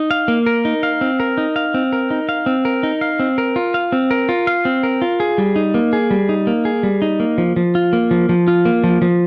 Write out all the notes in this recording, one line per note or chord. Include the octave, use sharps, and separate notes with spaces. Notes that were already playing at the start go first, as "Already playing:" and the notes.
Already playing: D#4
F5
A#3
A#4
D#4
F5
C4
A#4
D#4
F5
C4
A#4
D#4
F5
C4
A#4
D#4
F5
C4
A#4
F4
F5
C4
A#4
F4
F5
C4
A#4
F4
G#4
G3
D#4
A#3
G#4
G3
D#4
A#3
G#4
G3
D#4
A#3
F3
F3
F4
A#3
F3
F3
F4
A#3
F3
F3